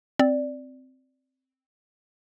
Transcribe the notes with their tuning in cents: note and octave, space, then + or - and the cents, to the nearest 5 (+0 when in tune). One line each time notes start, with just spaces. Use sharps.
C4 +0 D5 +0